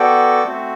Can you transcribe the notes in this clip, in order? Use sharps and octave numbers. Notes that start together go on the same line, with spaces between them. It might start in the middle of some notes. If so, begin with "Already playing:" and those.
Already playing: B3 F#4 A4 D5 G5
A3 C4 F#4